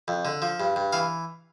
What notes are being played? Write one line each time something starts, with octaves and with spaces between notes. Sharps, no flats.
F2
D3
F3
G2
G2
E3 F5